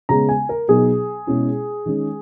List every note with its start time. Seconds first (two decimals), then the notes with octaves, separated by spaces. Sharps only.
0.09 C#3 G#3 B3 A#5
0.29 G#5
0.49 A#4
0.68 B2 F#3 B3 D#4 G#4
1.27 B2 G#3 C#4 E4
1.86 D#3 G#3 C#4